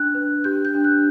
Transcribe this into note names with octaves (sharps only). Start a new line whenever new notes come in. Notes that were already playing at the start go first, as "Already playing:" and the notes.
Already playing: D4 F#6
B4
G4 G6
G6
D4
F#6